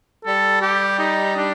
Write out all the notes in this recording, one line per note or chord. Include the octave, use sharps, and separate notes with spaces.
G3 A4
G4
D#4
D4